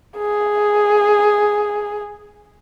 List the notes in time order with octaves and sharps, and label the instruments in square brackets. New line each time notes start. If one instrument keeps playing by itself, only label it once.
[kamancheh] G#4